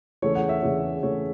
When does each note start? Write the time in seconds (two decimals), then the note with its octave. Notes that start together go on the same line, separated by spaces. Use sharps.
0.22 E2 C#3 A3 C#5
0.35 F#5
0.49 E5
0.62 E2 C#3 A3 C#5
1.03 E2 C#3 A3 C#5